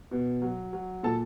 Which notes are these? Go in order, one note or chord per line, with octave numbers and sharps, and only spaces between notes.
B2
F#3
F#3
A#2 A4 A5